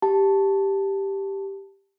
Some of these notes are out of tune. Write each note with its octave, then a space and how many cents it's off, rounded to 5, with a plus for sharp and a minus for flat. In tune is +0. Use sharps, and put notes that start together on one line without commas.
G4 +0 A5 +0